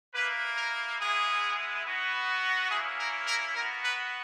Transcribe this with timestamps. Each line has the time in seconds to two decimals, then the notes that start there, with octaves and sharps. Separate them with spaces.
0.14 A#3 E4 B4
0.57 A#4
0.99 G#3 B3 E4 G#4
1.84 B3 F#4
2.70 A#3 C#4 E4 G#4
2.99 A#4
3.27 A#4
3.56 B3 F#4 A#4
3.84 B4